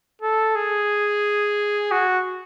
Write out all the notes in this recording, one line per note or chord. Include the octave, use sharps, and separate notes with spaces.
A4
G#4
F#4